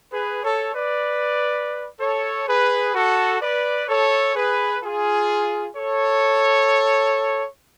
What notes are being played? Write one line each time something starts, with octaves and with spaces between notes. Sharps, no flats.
G#4 B4
A4 C#5
B4 D5
A4 C#5
G#4 B4
F#4 A4
B4 D5
A4 C#5
G#4 B4
F4 G#4
A4 C#5